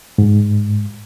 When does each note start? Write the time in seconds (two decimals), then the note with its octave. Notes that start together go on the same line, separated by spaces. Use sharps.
0.18 G#2